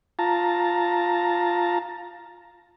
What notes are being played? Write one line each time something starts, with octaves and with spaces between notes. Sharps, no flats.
F4 A5 A#5